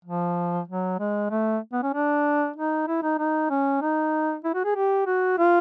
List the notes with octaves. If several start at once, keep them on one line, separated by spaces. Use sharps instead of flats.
F3
F#3
G#3
A3
B3
C#4
D4
D#4
E4
D#4
D#4
C#4
D#4
E4
F#4
G#4
G4
F#4
F4